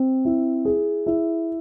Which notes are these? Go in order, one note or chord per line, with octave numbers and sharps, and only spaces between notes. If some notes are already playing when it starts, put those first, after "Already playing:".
Already playing: C4
E4
G#4
E4